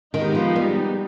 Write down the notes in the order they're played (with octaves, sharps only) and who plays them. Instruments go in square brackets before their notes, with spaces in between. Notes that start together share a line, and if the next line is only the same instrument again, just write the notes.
[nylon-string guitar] D#3 [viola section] G#3 B3 D#4 G4
[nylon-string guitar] F3
G3